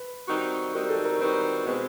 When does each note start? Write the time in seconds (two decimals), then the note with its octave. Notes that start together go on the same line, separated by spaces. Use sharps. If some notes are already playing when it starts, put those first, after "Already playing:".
Already playing: B4
0.28 D#3 G3 C4 D#4 F#4
0.74 D#3 G3 C4 D#4 F#4 A#4
0.89 A4
1.04 A#4
1.20 D#3 G3 C4 D#4 F#4 B4
1.65 B2 G#3 C4 B4